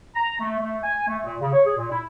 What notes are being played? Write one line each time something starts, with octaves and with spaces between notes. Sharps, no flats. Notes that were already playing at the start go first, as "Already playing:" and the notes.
A#5
A3
A3
G#5
A3
A#2
C#3
C#5
G#4
A#2
E4